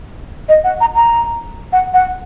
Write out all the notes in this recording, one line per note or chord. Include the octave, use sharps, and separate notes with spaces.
D#5
F#5
A#5
A#5
F#5
F#5